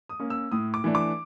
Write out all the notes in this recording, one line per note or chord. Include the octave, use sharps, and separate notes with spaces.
D#6
A#3 C#4
E6
A2 D#6
D6
E3 A3 D4
D6